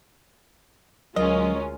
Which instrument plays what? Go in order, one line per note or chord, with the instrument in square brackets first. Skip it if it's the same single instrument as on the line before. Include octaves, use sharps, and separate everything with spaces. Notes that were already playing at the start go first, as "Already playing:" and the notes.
[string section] D2 G#3 C#4 [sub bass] F#3 [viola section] F4 A#4 [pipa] D#5